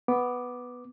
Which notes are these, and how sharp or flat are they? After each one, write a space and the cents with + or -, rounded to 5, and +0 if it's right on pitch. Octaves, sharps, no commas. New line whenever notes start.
B3 +0 D6 +0